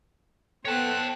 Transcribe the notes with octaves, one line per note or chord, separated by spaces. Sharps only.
B3 A4 C5 C#5 G5 A5 F#6